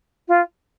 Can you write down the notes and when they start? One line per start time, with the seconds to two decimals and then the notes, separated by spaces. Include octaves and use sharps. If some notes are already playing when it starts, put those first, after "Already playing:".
0.28 F4